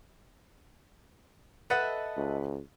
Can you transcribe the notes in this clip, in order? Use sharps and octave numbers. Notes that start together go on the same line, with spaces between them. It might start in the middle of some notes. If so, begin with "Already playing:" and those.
A4 B4 D#5 E5 F#5
C#2